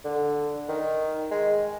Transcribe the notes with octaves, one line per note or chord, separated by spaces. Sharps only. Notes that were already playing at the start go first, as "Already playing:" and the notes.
D3
D#3
G#3